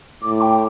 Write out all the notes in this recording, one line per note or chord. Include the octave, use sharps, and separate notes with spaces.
A2 D6
G5